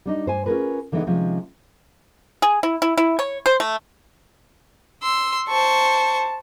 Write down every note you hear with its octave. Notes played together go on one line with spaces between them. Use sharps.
G3 D4 D#4
G2 C5 G#5
C#4 F4 G4 G#4 A#4 B4
D3 E3 G#3 B3 D#4
C3 D#3 F3 G#3 C4 C#4
G#4
E4
E4
E4
C#5
C5
A3
C6 E6
C5 A5 C#6